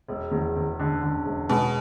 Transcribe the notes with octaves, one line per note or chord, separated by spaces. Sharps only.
E1
E2
E2
D3
D3
E1
B2 G#3